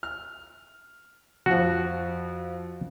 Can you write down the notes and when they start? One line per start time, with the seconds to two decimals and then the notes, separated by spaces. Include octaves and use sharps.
0.03 F6
1.46 F2 F3 F#4